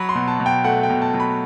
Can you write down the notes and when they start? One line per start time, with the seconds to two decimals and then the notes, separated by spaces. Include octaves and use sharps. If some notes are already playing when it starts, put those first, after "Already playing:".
Already playing: F#3 B5
0.09 C6
0.15 B2
0.28 A5
0.40 B2
0.46 G5
0.64 A3 F#5
0.83 G5
0.90 B2
1.02 A5
1.14 F#3
1.20 B5